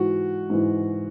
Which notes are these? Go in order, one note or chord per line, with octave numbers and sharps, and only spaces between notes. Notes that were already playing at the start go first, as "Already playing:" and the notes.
Already playing: G#2 E3 F#4
G#2 E3